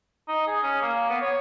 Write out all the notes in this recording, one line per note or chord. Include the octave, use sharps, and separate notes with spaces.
D#4
G#4
C#4
A#3
B3
C#5